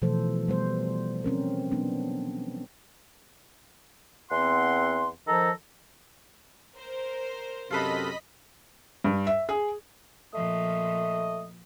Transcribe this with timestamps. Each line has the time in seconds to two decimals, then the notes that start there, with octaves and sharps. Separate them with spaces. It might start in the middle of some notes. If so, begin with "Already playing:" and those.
0.02 B2 E3 F3 A3 A4 C5
0.48 G3 B3 C5
1.24 C4 C#4 A#4
1.71 F#3 B3 D4
4.31 E2 C4 F#5 C6
5.27 D#3 F3 A4 A#5
6.76 A#4 C5
7.71 F#2 C3 F4 A4 B4 D#5 B5 B6
9.04 G2
9.27 E5
9.49 G#4
10.34 A#2 F3 A3 D#5